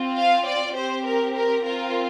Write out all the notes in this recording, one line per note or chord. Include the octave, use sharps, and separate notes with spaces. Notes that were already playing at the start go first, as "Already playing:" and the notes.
Already playing: C4 F4
F5
D5
C4 G4 C5
A#4
A#4
C4 F4 A#4